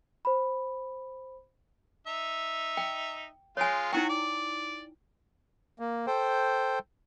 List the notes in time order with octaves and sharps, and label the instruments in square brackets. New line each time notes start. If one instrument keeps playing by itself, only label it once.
[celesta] C5 B5
[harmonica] D#4 E5
[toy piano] G5
[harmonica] G#3 F4 [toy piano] C#5 G#5
[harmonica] F#3 F#4 [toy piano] D#4 E4 G5
[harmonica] D5
[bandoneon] A#3
A4 C5 G5